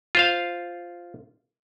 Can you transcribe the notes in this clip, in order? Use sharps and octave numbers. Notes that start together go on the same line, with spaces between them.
F4 C5 F5